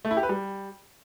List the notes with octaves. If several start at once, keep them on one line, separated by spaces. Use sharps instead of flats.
A3
E4
G4
B4
G3